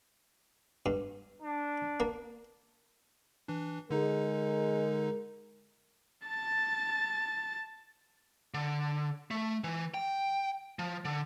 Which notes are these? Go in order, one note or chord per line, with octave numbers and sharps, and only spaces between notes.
G2
D4
A#3
E3 D4
D3 G#3 D#4 A#4
A5 A6
D3
A3
E3
G5
F3
D3